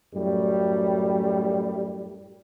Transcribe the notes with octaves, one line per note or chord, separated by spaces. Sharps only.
F#2 A2 G3